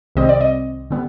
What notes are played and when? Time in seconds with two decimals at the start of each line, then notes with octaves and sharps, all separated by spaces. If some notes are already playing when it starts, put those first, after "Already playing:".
0.16 C2 C3 D#3 G3 C4 D#5
0.29 D5
0.41 D#5
0.90 D3 G3 B3